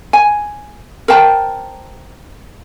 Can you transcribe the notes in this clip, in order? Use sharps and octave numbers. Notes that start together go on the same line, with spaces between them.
G#5
A#4 C5 G5 A5